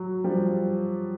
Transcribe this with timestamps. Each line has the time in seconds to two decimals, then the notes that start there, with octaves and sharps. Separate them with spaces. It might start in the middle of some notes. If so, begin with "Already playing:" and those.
Already playing: F#3
0.24 F3 G3